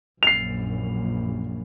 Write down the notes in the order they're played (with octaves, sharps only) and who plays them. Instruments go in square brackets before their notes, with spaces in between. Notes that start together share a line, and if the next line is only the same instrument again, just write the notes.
[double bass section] A#1 F#2 [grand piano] C7 F7